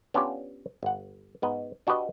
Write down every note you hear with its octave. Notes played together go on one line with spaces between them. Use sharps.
B3 C#4 D4 F4 G4
G1 F#5
G#2 B3 D#5
D4 F#4 G4 B4 D#5